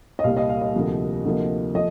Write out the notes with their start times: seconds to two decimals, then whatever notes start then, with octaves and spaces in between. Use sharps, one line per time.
0.19 D#5
0.24 C2 A#2 G3 F5
0.37 D#5
0.49 F5
0.62 D#5
0.74 D2 C3 F3 A#3
1.25 D2 C3 F3 A#3
1.74 F3 A3 D#5